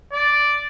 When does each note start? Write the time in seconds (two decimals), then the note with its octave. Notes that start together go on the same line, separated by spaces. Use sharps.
0.13 D5